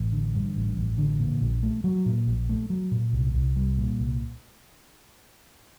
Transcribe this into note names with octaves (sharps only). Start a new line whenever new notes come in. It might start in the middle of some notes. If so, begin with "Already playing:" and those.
Already playing: A1
D3
G2
A1
A1
D3
A#2
A#1
A3
F#3
A#2
A#1
A3
F#3
A#2
C2
C2
G3
A#2
C2